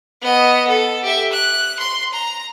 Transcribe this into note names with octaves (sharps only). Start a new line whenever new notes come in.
B3 D#5
A4
G4 E5
F#6
C6
A#5